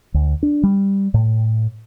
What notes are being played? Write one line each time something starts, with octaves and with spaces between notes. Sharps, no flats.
D2
D4
G3
A2